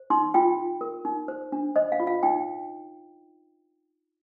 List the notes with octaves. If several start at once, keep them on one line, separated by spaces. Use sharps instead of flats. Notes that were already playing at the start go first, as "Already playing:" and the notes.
Already playing: C5
D#4 C6
F4 G5
F4
A#4
D#4
C5
D4
C5 D#5
F5
F4
F5
D#4 G5